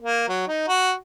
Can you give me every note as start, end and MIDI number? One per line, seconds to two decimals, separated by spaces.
0.02 0.25 58
0.28 0.44 54
0.48 0.66 63
0.68 0.93 66